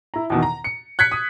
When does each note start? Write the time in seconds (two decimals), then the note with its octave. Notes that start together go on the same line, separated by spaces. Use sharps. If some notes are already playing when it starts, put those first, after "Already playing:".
0.14 E4 A#5
0.30 E2 B2 D#3
0.43 A#5
0.64 C#7
0.99 F#6 G#6 B6 C#7
1.11 D#6